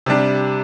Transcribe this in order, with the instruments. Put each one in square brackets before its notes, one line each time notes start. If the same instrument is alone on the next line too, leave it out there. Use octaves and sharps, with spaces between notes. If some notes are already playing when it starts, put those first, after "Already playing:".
[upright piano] C3 G3 D4